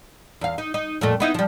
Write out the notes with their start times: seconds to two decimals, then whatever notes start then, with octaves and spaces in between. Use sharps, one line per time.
0.41 E2 F5
0.58 D#4
0.74 D#4
1.01 F2 A#2 A3
1.20 B3 D#4 E4
1.34 F3 G3